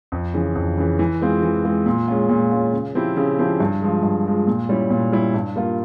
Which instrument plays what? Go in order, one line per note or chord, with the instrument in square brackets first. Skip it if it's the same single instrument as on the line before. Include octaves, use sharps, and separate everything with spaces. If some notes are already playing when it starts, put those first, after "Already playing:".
[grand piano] F2
C#3 E3
F2
C#3 E3
E3
G#3 C4 F4
E3
G#3 C4 F4
A#2
G#3 C#4 F4
A#2
G#3 C#4 F4
C#3
F3 C4 E4 G4
C#3
F3 C4 E4 G4
G2
F3 G#3
G2
F3 G#3
A#2
G3 C#4 E4
A#2
G3 C#4 E4
G2
G3 A#3 F4